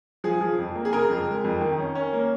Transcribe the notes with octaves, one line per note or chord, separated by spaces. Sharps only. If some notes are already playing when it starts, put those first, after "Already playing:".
F3 G#4
F3
F2
A#3
G#4
C#3 A#4
F2
G#3
F2
D#3
C#4
C#4
A#3